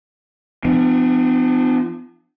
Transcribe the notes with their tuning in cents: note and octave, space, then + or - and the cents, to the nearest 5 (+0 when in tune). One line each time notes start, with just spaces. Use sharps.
F3 -20 B3 +40 D4 +35